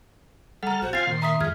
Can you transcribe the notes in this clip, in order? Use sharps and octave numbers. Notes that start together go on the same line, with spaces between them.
G3 A4 F#5 A#5 F6
A#1 F#4 C5
C4 F4 F5 G#5 A6 C7
A#2 D#3 C6
E5 A#5 D#6 B6
F2 G#2 F6 G#6